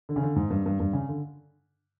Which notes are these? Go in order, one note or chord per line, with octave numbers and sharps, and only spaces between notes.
D3
C#3
D3
G#2
G2
G2
G2
C#3
D3